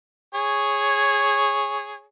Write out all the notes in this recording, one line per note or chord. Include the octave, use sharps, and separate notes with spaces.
G#4 C#5